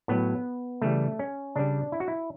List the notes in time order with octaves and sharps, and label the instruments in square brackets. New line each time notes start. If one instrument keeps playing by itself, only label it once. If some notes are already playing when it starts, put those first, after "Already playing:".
[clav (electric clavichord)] A2 F#3 B3
C#3 E3 G3 A3
C#4
C#3 G3 D4
E4
F#4
E4